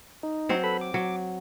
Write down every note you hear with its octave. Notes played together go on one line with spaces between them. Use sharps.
D#4
F#3 C4 C5
A4 B4 B5
D6
F#3